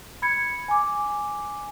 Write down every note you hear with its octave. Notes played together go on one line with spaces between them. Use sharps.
B5 G#6 C#7
G#5 D6